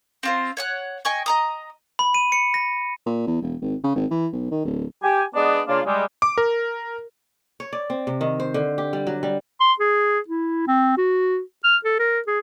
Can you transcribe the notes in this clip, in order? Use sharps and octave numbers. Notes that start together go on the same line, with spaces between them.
C4 F4 C5
C#5 F#5 F#6
D#5 G5 G#5 C#6
D#5 A#5 D#6
B5
D#7
C#7
A#6
A#2
E2
E1
G#1
C#3
G#1
E3
B1
D#3
D1
G4 G#5
G#3 B3 D4 D#5
C#3 A#3 D4 F4
G3 G#3
D6
A#4
C#5
D5
C4
C3
D#3
C5
D3
G4
G3
F#3
G3
C6
G#4
E4
C4
F#4
F6
A4
A#4
G#4